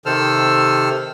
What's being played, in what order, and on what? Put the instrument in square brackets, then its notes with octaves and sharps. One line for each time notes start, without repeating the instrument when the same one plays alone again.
[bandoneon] C3 D#3 A4 C5 E6 F6